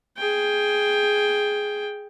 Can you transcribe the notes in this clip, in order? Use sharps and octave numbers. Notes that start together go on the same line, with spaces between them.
G#4 G5